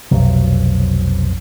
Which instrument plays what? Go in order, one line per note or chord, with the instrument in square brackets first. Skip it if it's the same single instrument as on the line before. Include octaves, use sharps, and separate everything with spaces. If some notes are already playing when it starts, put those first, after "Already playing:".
[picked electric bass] F1 B1 F#3